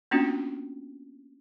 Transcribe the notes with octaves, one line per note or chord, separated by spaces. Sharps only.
A#3 B3 C#4 D4 F4 F#4